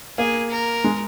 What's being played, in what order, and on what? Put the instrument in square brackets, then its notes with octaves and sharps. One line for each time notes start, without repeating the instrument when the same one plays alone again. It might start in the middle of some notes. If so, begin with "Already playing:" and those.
[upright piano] A#3 [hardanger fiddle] G#4
[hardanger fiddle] A#4
[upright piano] G#3